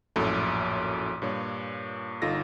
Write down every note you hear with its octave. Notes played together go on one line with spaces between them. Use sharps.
A#1 F#2 A2 A4 B5
G2 A#2 C#5
G1 D#4 F4 A4 A#6